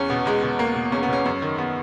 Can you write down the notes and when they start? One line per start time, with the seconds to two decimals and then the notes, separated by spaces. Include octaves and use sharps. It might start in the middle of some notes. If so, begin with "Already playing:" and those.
Already playing: E2 C#4
0.10 B2 B3
0.26 E2 G#3
0.43 B2
0.59 E2 A#3
0.76 B2
0.92 E2 C#4
1.03 B3
1.08 B2 C#4
1.26 F#2 C#4
1.42 D#3
1.58 B3